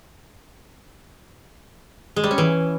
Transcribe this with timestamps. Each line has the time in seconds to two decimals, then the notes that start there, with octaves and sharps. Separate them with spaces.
2.16 G#3
2.24 G3
2.31 C#4
2.38 E3